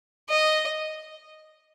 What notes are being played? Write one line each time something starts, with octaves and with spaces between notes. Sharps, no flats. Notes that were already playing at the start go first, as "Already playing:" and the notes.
D#5